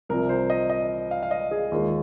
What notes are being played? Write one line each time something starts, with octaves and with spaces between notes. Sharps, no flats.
C2 C3 F3 A#4
C5
D#5
D#5
F5
F5
D#5
G#4
D#2 D#3 G#3 F4